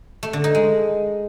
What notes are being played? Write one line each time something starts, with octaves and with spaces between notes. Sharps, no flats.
A3
D3
D#4
G#3